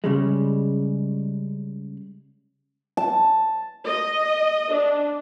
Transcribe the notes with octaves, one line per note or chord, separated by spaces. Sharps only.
C#3 G3 G#3
A5
D#5
D4